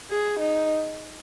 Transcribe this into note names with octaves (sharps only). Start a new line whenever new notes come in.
G#4
D#4